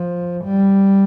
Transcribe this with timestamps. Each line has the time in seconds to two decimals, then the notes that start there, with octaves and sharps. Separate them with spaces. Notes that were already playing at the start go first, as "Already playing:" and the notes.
Already playing: F3
0.45 G3